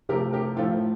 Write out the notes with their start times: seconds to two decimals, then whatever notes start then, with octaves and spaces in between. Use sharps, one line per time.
0.09 C3 F3 A3 G4 A#4
0.33 G4 A#4
0.57 A2 F3 A3 F4 A4